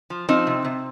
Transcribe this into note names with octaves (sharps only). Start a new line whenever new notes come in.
F3
F3 C4 D#4
C3
C3